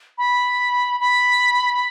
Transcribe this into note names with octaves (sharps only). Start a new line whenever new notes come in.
B5
B5